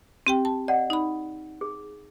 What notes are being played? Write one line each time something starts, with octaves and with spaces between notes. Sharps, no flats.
C4 G4 G5
A5
D5 D#5 F#5
D#4 B5
G#4